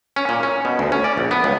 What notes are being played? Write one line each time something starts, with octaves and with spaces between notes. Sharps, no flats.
C#4
A#2
C#4
B2
D2
C#4
D5
A#1
B3
C#2